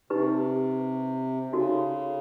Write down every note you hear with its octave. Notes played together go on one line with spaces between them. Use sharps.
C3 D#4 G4 B4
C#3 D#4 F#4 A4